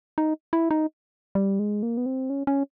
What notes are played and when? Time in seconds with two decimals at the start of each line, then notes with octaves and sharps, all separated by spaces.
0.18 D#4
0.53 E4
0.71 D#4
1.35 G3
1.59 G#3
1.83 A#3
1.97 B3
2.06 C4
2.30 C#4
2.47 C#4